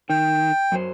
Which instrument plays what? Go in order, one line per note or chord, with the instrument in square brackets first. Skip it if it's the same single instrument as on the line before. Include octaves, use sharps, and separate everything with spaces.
[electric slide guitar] D#3 [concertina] G5
[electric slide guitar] F#2 F#3 C5